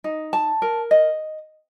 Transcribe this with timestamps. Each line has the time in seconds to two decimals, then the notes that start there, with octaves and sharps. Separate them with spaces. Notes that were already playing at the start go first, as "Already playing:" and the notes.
0.04 D#4
0.33 A5
0.62 A#4
0.91 D#5